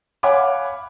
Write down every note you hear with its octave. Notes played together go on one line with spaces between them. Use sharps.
C#5 F5 F#5 G#5 B5 D6